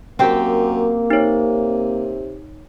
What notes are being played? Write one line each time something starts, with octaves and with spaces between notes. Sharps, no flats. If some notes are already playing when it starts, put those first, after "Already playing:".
F#2 A#3 C4 G4
C3 D#4 C#5